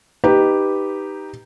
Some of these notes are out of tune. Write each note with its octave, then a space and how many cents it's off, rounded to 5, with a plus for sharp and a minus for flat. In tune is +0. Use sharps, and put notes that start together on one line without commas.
D#4 +0 G4 +0 B4 +0